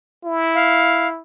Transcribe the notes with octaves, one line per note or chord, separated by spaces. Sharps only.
E4
F5